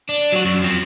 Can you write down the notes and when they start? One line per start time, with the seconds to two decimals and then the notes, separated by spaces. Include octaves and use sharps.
0.09 D4
0.32 F#3 F#4
0.45 F#2
0.63 F3 C4